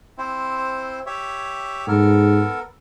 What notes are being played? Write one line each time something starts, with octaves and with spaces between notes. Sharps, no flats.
C4 E4 C5
G4 C#5 E5
G#2 B3 A4 A#4